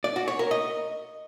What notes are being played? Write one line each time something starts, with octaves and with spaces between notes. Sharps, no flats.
D5
F#4
C#5
A#4
D#5